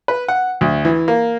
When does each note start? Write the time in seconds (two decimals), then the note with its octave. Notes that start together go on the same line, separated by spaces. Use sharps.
0.08 B4
0.28 F#5
0.61 D2
0.85 E3
1.08 A#3